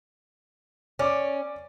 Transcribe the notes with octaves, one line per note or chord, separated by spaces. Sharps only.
C#4 D5 D6